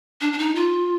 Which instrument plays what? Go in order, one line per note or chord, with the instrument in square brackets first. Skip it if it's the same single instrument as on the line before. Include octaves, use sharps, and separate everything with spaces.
[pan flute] D4
D4
D#4
F4